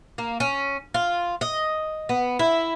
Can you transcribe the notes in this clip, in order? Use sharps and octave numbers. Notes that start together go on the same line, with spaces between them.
A#3
C#4
F4
D#5
B3
E4